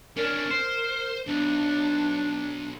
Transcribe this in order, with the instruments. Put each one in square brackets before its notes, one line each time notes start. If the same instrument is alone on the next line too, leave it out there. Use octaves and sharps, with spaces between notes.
[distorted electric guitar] C#4 D4 [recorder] A#4
[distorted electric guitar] C5
[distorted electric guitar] B1 [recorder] D4